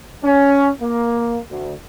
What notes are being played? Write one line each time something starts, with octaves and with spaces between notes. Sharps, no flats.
C#4
A#3
D2